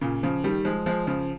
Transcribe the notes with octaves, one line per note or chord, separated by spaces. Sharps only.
A#2 C#3
C#3 F3
D#3 G3
F3 G#3
F3 G#3
C#3 F3